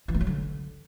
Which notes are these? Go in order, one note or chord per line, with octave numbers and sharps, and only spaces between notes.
E3
A#3
F#3
D3